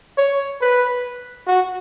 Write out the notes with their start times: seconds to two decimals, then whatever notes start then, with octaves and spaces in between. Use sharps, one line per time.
0.18 C#5
0.61 B4
1.47 F#4